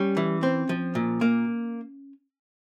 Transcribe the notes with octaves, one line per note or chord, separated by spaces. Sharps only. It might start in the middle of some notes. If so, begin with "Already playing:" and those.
Already playing: G3 C#4
E3
C4
F3
A#2
A#3